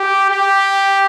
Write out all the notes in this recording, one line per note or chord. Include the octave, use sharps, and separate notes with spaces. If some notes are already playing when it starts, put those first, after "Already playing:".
Already playing: G4
G4